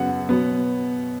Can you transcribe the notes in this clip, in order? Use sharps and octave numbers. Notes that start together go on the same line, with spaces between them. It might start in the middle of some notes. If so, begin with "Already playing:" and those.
Already playing: F#2 C#3 F#3 B3 F#5
B2 F#3 B3